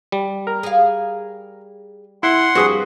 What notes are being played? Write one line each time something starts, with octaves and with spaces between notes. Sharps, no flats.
G3
A#4
G#4 F5
E4 F#5 C6
G2 F3 C4 F#4 G#4 B4